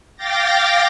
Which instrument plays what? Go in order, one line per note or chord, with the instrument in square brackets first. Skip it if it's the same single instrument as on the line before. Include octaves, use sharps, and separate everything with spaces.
[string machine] F5 G5 D6 A6 A#6